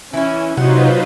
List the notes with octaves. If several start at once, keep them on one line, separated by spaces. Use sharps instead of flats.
E3 C#4 E4
C3 F#3 D#4 F4 B4 C5 F#5